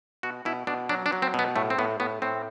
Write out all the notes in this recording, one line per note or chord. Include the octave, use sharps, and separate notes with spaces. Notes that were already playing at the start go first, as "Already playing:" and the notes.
B2 F#4
B2 E4
B2 D4
F#3 D4
D4
F#3
C4
B2
B3
A2 A3
C4
A2 B3
A2 B3
A2 C4